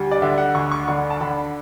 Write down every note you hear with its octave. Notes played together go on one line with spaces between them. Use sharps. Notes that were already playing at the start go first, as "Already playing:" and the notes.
Already playing: D2 G3
D5
D3 E5
F#5
D2 C#6
C#6
D3 C#6
A5
D3 B5